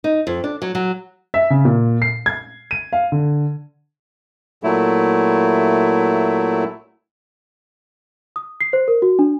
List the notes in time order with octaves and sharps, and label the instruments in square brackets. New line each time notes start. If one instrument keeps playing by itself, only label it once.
[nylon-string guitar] D#4
F2
D4
F#3
F#3
[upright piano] E5
C#3
A#2
C7
G#6
D#7
F5
D3
[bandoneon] A#2 F#3 A3 E4
[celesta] D#6
C7
C5
A#4
F#4
D4